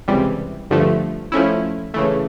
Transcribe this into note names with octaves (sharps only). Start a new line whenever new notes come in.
C#2 C3 E3 G3
G1 G2 D3 F3 A3
F3 A3 C#4 E4
C#3 E3 A3